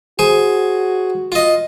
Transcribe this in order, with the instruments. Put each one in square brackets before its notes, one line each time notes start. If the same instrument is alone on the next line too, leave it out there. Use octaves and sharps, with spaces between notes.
[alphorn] F#4 [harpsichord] G#4 C5 G#5
[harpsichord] F4 D#5